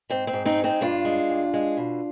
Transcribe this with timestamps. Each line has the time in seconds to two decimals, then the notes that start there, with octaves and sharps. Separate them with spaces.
0.10 G#2 C4
0.27 C4
0.33 G#2
0.45 C4 D#4
0.58 G#3
0.64 C4 D#4
0.81 G2 D4 F4
1.05 G#3
1.29 G2
1.54 G#3
1.77 B2